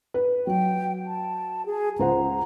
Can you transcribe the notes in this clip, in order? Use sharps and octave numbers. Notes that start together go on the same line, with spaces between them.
B4
F#3 G5
A5
G#4
C#2 C5 F#5 A#5